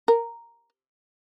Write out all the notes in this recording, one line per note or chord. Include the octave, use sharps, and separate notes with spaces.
A#4